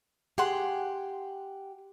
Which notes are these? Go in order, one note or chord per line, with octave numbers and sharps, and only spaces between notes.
G4 G#4 F#5 C6